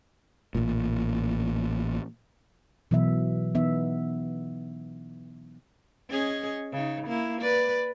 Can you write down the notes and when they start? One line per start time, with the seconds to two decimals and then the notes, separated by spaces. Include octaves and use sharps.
0.55 A1 A#2
2.91 B2 E3 F#3 B3 E5
3.55 E3 B3 D#4 E5
6.10 C#4 G#4 D#5
6.73 C#3 D#4
7.08 A#3 E4
7.42 B4 D5